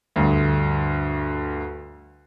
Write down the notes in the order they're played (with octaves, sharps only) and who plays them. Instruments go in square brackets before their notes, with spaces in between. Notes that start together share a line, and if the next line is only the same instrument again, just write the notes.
[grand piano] D2 G2